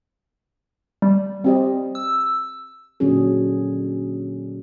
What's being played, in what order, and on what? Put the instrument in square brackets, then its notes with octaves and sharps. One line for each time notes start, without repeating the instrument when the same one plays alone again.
[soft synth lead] G3
[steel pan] C4 G4 D#5
[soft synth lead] E6
[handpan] A#2 D3 F#3 C#4 D4 G#4